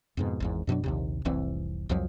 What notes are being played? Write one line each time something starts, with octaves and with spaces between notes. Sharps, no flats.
F2 G#2 B2
G#1 E2 G#2
F#2 B2 F#3 D4
A#1 D#2 C3
F1 C2 E3 C4
C2 F2 F3 F#3